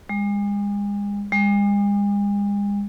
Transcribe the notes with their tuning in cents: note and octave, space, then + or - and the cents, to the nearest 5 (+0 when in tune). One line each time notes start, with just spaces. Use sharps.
G#3 -40
G#3 -45